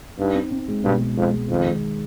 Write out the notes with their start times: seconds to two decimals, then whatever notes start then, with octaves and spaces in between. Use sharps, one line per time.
0.19 G2 D#4
0.35 C4
0.51 C4
0.68 G#3
0.83 G2 B2
1.01 G#3
1.17 F2 G#3
1.34 G#3
1.49 F2 D#3
1.66 G#3